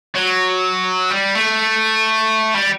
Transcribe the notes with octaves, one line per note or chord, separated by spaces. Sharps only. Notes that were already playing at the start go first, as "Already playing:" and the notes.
F#3
G3
A3
G3